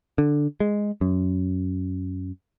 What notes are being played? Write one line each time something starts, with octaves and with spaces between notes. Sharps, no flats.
D3
G#3
F#2